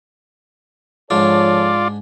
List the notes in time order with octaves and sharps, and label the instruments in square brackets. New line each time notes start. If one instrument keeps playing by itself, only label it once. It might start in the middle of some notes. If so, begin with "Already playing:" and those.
[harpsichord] G#2 D4 [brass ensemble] F3 A4 C#5 [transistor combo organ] F4 D5